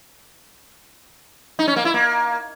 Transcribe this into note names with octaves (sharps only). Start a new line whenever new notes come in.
D#4
C#4
A#3
E4
A#3